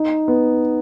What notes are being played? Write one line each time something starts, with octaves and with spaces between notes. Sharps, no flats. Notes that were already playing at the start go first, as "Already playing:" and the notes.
Already playing: D#4
B3